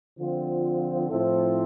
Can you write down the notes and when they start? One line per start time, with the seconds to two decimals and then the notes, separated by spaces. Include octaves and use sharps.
0.18 D3 F3 C4 F4
1.09 A2 F3 C4 E4 A4